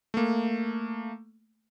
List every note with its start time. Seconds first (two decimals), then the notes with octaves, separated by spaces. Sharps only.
0.14 A3 A#3